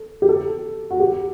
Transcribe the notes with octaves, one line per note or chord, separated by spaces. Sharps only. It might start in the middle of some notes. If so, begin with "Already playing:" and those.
Already playing: A4
G4
A4
F#4
G4